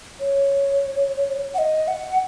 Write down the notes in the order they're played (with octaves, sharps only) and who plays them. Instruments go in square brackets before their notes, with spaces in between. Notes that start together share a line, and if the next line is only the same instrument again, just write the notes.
[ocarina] C#5
F#5
D#5
F#5